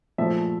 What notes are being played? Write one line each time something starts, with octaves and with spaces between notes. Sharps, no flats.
A#2 F3 A3 E5